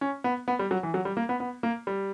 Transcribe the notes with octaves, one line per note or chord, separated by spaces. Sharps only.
C#4
B3
B3
G3
F#3
E3
F#3
G3
A#3
B3
B3
A#3
G3